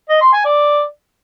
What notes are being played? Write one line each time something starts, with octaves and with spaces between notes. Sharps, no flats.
D#5
C6
G#5
D5